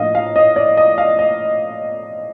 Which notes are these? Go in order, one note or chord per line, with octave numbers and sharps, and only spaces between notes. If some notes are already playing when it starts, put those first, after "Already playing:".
Already playing: A2 F3 A#3 D4 D#5 F5
F5
D#5
D5
D#5
F5
D#5